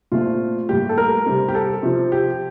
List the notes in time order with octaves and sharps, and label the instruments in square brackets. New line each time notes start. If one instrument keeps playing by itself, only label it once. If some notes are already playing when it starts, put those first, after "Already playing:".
[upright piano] A#2 A3 C4 F4
A2 G3 A#3 G4
A4
A#4
C3 G3 C4
G4
A4
C3 F3 C4
G4